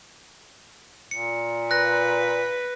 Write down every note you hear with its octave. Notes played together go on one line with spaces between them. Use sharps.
A#2 C#7
B4 F#6 A#6